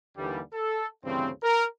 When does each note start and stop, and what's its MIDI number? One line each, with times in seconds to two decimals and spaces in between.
0.17 0.40 39
0.17 0.40 50
0.17 0.40 52
0.17 0.40 55
0.53 0.87 69
1.05 1.29 38
1.05 1.29 43
1.05 1.29 49
1.05 1.29 52
1.05 1.29 60
1.43 1.64 70